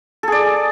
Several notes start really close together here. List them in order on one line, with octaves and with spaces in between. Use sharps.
A4 G#4 D5